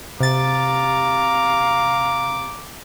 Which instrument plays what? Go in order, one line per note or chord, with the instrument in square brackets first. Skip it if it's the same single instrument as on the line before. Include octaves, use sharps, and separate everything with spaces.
[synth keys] C3 A6 [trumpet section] F5 A#5 [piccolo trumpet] D6